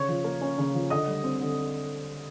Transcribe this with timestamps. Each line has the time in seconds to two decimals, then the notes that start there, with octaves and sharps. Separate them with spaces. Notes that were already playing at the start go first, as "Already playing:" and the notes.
Already playing: C#3 C#5 C#6
0.08 F3
0.24 A#3
0.41 C#4
0.58 C#3
0.74 F3
0.90 D3 D#5 D#6
1.07 G3
1.24 C4
1.41 D3